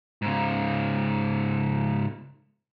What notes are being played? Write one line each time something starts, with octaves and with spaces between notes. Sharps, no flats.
G#2 C#3